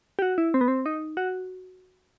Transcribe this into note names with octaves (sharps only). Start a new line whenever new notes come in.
G4
F#4
E4
C4
B3
C4
D#4
F#4